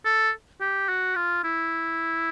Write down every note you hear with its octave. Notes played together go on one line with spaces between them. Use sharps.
A4
G4
F#4
F4
E4